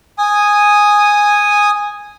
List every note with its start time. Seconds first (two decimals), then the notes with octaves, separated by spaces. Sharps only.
0.18 G#5 D#6